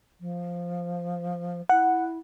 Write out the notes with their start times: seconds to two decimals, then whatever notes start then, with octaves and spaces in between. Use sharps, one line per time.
0.20 F3
1.69 E4 F#5